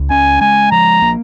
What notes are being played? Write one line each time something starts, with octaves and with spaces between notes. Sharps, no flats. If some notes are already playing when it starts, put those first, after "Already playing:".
Already playing: C#2
C#4 G#5
G#3 G#5
F3 A#5
A#3